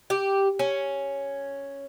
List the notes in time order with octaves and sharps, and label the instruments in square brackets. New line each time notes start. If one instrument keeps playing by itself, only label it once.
[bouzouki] G4
C#4